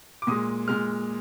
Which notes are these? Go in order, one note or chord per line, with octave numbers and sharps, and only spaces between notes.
D6
A#2 G#3 D#6
A#2 G#3 F6